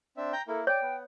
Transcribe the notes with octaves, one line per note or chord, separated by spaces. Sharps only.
C4 D4 E5
G5 A#5 G6
A#3 E4 A4
C#5 D5 G5
B3